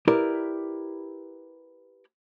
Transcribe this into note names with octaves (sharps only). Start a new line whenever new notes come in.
E4 G4 A#4 B4 D5